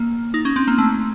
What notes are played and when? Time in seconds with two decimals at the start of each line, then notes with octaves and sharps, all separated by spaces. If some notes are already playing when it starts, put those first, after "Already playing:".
Already playing: A#3
0.34 D#4
0.45 C#4
0.56 C4
0.68 A#3
0.78 A3